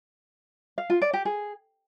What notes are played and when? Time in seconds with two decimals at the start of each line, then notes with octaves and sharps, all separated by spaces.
0.78 F5
0.90 F4
1.02 D5
1.13 G4
1.25 G#4